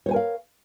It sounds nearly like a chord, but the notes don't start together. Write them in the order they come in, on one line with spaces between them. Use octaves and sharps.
C#5 C5 G#5 A#4 F5